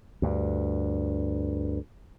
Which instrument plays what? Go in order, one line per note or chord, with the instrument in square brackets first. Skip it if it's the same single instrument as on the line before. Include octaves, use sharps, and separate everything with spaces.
[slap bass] D2 G2